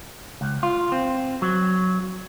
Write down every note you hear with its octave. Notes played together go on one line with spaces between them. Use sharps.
C#2
F4
C4
F#3